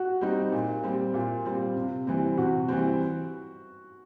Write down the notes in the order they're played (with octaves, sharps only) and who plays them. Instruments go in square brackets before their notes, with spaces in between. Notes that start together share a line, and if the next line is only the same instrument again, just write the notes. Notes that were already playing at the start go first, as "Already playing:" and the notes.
Already playing: [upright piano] F#4
[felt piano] G3 C4 D#4
A#2
G3 C4
[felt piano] A#2 [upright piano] F4
[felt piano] G3 C4
C3
E3 G3 C4
[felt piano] C3 [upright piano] F#4
[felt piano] E3 G3 C4